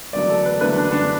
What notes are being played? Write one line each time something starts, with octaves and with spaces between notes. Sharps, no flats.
F#1 E2 D3 F#3 A3 D5
A4
B4
F#1 E2 D3 F#3 A3 B4
D4
D4